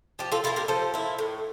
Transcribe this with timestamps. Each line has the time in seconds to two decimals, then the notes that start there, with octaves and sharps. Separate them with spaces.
0.19 F3 G4
0.32 F4 A4
0.44 A#3 E4 F4 A4
0.56 G4 A#4
0.68 F3 A4 C5
0.94 A#3 E4
1.18 A2